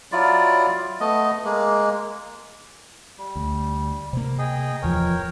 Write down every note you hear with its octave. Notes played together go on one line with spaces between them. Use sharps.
F#3 E4 F4 D5
A3 B3 D#5
G#3 A#3
G3
D2
C3 A#3
G#4 D#5 G5
D1 E2 F3 A#4 C#5 G5